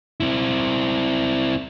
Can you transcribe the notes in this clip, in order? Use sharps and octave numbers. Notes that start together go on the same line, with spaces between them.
C4 E4